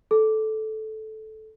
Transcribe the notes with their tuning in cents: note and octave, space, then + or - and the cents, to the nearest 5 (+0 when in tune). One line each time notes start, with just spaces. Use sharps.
A4 -10